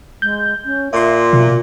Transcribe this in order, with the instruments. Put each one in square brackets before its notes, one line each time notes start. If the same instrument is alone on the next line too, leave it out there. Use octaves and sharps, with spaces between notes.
[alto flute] G#3 [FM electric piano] G6
[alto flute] C#4
[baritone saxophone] A#2 [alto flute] F4 [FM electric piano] E5 C6
[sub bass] B2